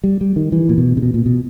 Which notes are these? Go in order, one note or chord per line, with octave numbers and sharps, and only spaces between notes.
G3
G3
D#3
E3
A#2
B2
C3
B2
A#2
B2